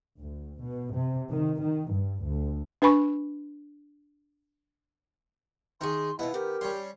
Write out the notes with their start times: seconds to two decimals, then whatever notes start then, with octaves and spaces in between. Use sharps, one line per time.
0.18 D2
0.61 B2
0.95 C3
1.32 D#3
1.62 D#3
1.92 G2
2.24 D2
2.82 D4 B4 G#5 B5 C#6
5.81 D#3 D#4 G#4 C6 C#6
6.19 B2 B3 E4 F4 D#5
6.34 D#3 G4 A#4
6.61 G3 C#4 C#5 C6